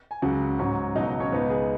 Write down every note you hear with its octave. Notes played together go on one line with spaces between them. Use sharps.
G#5
C#2 C#3 F#3 F#4 F#5
G#2 F#3 C#4
C#2 B2 F#3 D#4 D#5
D#4 D#5
C#4 C#5
C#2 B2 B3 D#4 B4
G#4